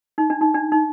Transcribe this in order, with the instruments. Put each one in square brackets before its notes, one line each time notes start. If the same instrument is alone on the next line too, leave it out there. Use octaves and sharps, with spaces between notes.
[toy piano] D#4
D4
D#4
D4
D#4